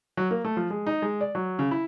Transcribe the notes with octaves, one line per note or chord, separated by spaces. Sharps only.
F#3
A#3
A3
F3
G#3
D#4
G#3
D5
F#3
C#3
E4